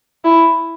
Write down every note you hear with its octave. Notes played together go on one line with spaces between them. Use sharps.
E4